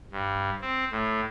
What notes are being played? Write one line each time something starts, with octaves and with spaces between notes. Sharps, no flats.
G2
C4
A2